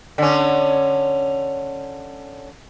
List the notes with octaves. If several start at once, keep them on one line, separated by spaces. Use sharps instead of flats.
D3 C#4